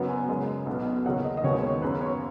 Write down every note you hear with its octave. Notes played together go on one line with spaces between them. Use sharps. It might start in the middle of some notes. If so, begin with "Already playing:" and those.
Already playing: F#1 F#2 F#3 B3
G#5
F#1 F#2 C#3 G#3
B1 B2 B3
D#2 C#3 F#3 F#5
D#5
D#5
D#2 D#3 G#3 B3 C#5
C#5
F#2 C#3 B3 B4
C#5